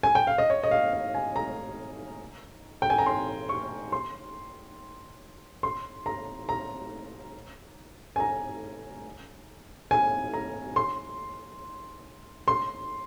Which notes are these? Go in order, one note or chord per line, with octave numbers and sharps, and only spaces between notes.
G#5
G5
F5
D#5
C#5
D#5
F5
F5
G#5
A#5
G5
G#5
A#5
C6
C#6
C6
C6
A#5
A#5
G#5
A#5
G#5
A#5
C6
C6